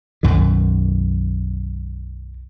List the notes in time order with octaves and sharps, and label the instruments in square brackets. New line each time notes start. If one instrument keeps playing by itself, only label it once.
[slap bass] B1 F#2 D#3